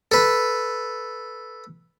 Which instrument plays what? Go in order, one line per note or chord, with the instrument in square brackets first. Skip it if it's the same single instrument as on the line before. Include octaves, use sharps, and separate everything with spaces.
[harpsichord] A4 B4